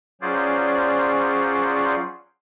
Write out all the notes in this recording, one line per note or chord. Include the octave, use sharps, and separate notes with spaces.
F#3 C#4 F4 G#4 C5 D5